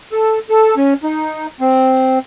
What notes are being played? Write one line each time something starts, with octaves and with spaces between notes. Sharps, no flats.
A4
A4
C#4
D#4
C4